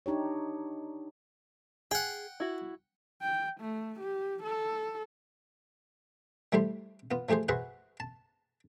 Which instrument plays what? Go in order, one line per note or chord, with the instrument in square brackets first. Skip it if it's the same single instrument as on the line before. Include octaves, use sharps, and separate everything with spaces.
[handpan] D4 D#4 G4 C#5
[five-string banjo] G#4 [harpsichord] F#5 G5
[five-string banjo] E4 F#4
[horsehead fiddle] G5
A3
G4
A4
[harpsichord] G3 A3 E4 G4 C5
B3 F4
F3 A3 G4 G#4 C5
F#4 G#4 B4 C5 E5 F#5
A5